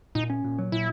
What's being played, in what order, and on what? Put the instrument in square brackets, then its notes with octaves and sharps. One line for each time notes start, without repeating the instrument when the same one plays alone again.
[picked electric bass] A#2 [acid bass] D#4
[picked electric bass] C#4
A#2
F#3
[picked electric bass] A#2 [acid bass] E4